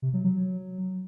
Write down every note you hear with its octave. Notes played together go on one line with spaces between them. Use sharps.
C3
F#3
F#3